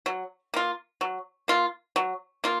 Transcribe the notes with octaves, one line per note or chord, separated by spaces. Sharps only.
F#3
A#3 F4
F#3
A#3 F4
F#3
A#3 F4